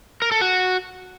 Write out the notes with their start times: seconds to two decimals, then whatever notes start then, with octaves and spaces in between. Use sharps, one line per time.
0.22 A#4
0.32 A4
0.41 F#4